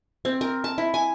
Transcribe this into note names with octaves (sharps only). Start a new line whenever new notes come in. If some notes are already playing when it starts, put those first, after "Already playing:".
C4
A#4
A5
E4
G#5